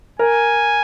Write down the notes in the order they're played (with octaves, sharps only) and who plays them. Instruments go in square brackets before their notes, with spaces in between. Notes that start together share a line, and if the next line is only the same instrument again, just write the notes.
[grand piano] A#4 [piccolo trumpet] G#5